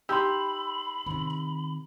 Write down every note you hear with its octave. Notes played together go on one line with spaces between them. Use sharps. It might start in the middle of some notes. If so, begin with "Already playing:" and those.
D#4 G4 B5 C6 E6
C3 D#3